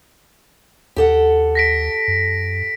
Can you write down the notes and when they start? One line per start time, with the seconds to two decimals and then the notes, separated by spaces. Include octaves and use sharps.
0.96 D#2 G4 A4 F#5
1.55 A#6 B6 D7
2.08 F#2